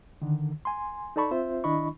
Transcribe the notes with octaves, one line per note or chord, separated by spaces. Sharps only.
D3 D#3
G#5 C6
D#4 A4 D5 A5 B5 C#6
C4 F4 C5 E5
D#3 D4 E4 D#5 B5 C#6